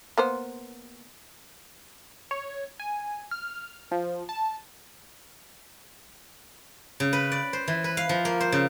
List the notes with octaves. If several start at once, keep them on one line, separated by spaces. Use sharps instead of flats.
A#3 B3 C5
C#5
G#5
F6
F3
A5
C#3
B4
D5
C5
E3
B4
F5
F3
A#3
C5
C#3